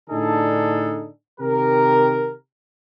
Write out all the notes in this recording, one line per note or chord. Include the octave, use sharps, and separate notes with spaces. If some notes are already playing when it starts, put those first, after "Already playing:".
A2 D3 D4 D#4 G#4 A4
C3 D#3 G4 A#4